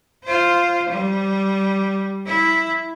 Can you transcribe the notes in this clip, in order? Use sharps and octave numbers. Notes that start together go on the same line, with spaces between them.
F4 C5
G3
E4